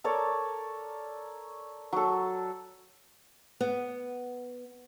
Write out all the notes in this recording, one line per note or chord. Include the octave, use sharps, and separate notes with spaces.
A4 A#4 C#5 D5
F#3 A4
B3